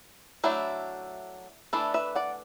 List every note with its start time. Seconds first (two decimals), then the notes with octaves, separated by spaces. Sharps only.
0.44 F#3 A3 D4 E4
1.73 E3 A3 D4 E4 A4
1.94 B4 E5
2.15 D5 F#5